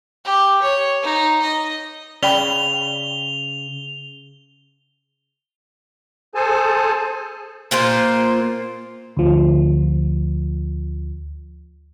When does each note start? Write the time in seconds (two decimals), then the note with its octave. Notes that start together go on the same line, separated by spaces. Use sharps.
0.25 G4
0.62 C#5
1.03 D#4
1.42 D#5
2.23 C#3 D5 G5 B5 F7 G7
6.35 G#4 A4 C5 G#5 A5
7.71 A#2 A#3 F4 C5
9.17 D2 F3